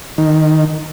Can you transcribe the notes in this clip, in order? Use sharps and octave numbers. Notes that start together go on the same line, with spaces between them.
D#3